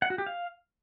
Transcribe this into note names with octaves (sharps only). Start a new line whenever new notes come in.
F#5
F#4
G4
F5